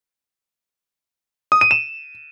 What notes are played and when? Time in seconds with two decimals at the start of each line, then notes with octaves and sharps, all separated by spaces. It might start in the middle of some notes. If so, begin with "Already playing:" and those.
1.52 D#6
1.61 D#7
1.71 E7